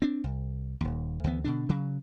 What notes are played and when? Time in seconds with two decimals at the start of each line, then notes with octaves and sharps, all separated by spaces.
0.02 C4 D4
0.24 C2
0.81 D#1 D#2
1.24 D2 E3 B3
1.44 B2 D3 D4
1.69 C#3 F#3